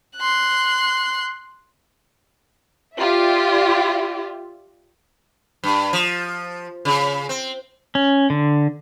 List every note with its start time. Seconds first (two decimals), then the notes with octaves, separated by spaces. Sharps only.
0.17 C6 F#6
2.97 F4 G4 D5 E5
5.64 G2
5.93 F3
6.85 C#3
7.29 C4
7.95 C#4
8.30 D3